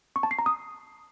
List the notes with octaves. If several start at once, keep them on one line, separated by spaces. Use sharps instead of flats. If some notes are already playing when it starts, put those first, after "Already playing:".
C#6
A5
C7
A#5
D#6